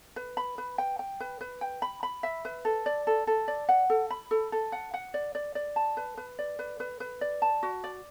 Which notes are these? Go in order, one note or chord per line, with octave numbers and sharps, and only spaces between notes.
B4
B5
B4
G5
G5
B4
B4
G5
B5
B5
E5
B4
A4
D5
A4
A4
D5
F#5
A4
B5
A4
A4
F#5
F#5
D5
D5
D5
A5
B4
B4
D5
B4
B4
B4
D5
A5
F#4
D5